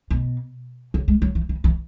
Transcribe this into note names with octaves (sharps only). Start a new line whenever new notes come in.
B2
C#3
G#3
F#3
E3
E3
E3